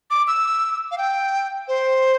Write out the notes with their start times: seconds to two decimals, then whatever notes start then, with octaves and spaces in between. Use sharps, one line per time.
0.10 D6
0.27 E6
0.91 F5
0.98 G5
1.68 C5